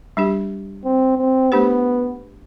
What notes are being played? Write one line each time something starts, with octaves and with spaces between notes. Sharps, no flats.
G3 D4 G4
C4
C4
A3 B3 D4 G4 C5